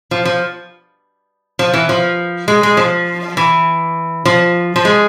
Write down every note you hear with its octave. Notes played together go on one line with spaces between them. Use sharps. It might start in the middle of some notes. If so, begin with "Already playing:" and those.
F3
F3
F3
E3
F3
G#3
G#3
F3
E3
F3
F3
G#3